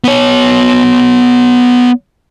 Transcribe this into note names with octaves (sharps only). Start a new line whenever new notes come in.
B3 C#5